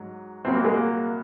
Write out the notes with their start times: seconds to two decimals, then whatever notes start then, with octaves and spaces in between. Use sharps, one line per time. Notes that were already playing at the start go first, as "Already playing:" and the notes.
Already playing: G#2 F#3
0.45 C2 A#2 F#3 C4
0.54 A#3
0.64 G#3
0.74 A#3